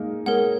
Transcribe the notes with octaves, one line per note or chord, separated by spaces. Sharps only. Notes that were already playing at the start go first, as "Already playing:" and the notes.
Already playing: G#3 A#3 D#4
G#3 A#4 C#5 F#5